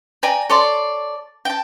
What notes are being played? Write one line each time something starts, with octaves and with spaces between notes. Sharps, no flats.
D5 G5 G#5 A#5
A4 C#5 D5 C6
G5 A5